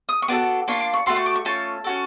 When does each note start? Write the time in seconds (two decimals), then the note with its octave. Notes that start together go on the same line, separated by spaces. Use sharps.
0.09 D#6
0.22 C#6
0.28 B3 D4 F#4 A4 D6
0.68 A#3 D4 F4 C#6
0.80 D6
0.94 C#6
1.06 A3 D4 F#4 A4 C6
1.16 C#6
1.26 D6
1.36 C#6
1.45 A3 C#4 F4 A5
1.84 C#4 F#4 A4